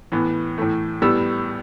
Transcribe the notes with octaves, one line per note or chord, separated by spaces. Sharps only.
A2 E3 B3
A2 E3 A3
A2 G3 B3 E6